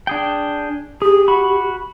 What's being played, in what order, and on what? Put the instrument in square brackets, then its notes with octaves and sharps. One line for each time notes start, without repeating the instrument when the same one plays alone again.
[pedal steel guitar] D4 G#4 G5
[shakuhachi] G4 [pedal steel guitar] G#4
[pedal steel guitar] F#4 B5 C#6